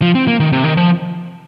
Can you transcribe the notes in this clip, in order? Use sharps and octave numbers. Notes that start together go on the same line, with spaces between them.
F3
C4
A#3
D#3
C3
D#3
F3